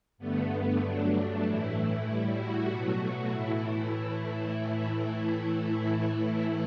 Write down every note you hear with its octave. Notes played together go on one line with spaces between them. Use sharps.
G2 D3 A3 B3
G2 F#3 A3 D4
A2 E3 A3 E4
A2 G3 E4
F#4
B2 F#3 A3
A2 E3 A3 E4